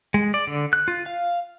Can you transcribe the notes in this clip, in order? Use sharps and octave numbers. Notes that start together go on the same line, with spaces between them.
G#3
D5
D3
F#6
F4
F5